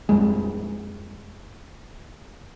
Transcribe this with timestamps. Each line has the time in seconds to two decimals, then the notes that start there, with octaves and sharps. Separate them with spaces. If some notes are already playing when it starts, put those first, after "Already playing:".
0.09 A#1 F2 G3 G#3